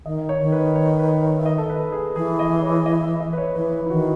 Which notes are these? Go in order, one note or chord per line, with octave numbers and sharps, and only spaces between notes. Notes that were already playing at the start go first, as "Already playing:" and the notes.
D#3 D#5
C#5
D#3
B4
C#5
B4
C#5
E5
D#5
A4
B4
G#4
E3 G#4
D#5
C#5
D#5
E5
D#5
B4
C#5
E3 B4
E4
D#3 F#4